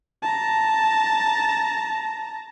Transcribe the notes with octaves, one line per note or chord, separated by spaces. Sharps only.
A5 A#5